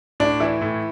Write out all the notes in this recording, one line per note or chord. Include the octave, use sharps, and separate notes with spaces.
A2 D4
E3 E4
A2